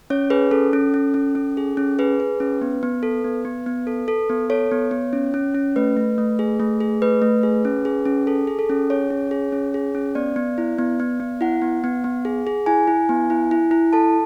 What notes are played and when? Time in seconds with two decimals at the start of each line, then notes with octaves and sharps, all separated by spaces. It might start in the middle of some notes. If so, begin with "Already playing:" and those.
0.10 C#4 C#5
0.30 G#4 B4
0.51 C#4 A4
0.73 C#4
0.94 C#4
1.14 C#4
1.35 C#4
1.57 G#4
1.77 C#4
1.99 G#4 B4
2.20 G#4
2.40 C#4
2.61 B3
2.83 B3
3.03 A4
3.24 B3
3.45 B3
3.66 B3
3.87 A4
4.08 A4
4.29 B3
4.50 A4 C#5
4.71 B3
4.91 B3
5.13 C#4
5.34 C#4
5.55 C#4
5.76 A3 B4
5.97 A3
6.18 A3
6.39 G#4
6.60 A3
6.80 G#4
7.02 A3 B4
7.22 A3
7.43 G#4
7.65 C#4
7.85 G#4
8.05 C#4
8.27 G#4 A4
8.47 G#4
8.59 A4
8.70 C#4
8.90 G#4 C#5
9.10 C#4
9.31 G#4
9.52 C#4
9.74 G#4
9.95 C#4
10.15 B3 D5
10.36 B3
10.58 E4
10.78 B3
11.00 B3
11.20 B3
11.41 E4 F#5
11.62 B3
11.84 B3
12.04 B3
12.25 G#4
12.47 G#4
12.66 E4 G#5
12.87 E4
13.09 B3
13.30 E4
13.51 E4
13.71 E4
13.93 A4 A5